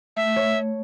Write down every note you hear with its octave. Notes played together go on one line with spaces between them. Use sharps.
A3 E5
C#5